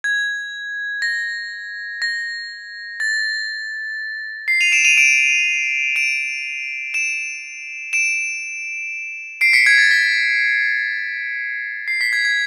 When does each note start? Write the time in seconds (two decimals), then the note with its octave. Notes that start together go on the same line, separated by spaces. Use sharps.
0.04 G#6
1.02 A#6
2.02 A#6
3.00 A6
4.48 C7
4.61 D#7 F7
4.72 D7 E7
4.85 D#7 F7
4.98 D7 E7
5.96 D7 E7
6.94 D7 E7
7.93 D7 E7
9.41 C7 D7
9.53 B6 C#7
9.66 G#6
9.78 A6
9.91 B6
11.88 C7
12.01 B6
12.13 G#6
12.25 G#6